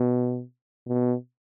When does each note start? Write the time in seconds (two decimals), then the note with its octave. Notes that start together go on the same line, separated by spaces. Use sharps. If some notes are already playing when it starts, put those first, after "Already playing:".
Already playing: B2
0.87 B2